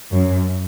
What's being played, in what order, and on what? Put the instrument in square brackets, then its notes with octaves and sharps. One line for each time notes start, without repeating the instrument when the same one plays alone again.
[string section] F#2